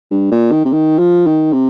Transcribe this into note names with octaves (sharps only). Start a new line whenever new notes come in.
G2
A#2
D#3
C3
D#3
F3
D#3
C3